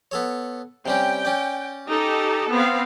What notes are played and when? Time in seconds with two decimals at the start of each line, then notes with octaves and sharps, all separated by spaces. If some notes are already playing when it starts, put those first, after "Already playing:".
0.11 B3 A4 C#5
0.86 C3 G3 C#4 G5
1.25 C#4 D5
1.89 D#4 G4 A4
2.51 B3 C4 F5